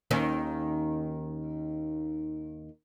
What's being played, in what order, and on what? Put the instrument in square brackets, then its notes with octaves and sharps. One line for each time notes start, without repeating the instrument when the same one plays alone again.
[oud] D#2 D#3 C#4